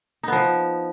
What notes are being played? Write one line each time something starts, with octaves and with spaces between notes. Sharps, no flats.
F3 B3 D#4